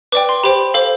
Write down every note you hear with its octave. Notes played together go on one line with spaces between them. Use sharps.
B4 D5 G5 D6
C6
G4 C5 G5 B5
A4 C5 F5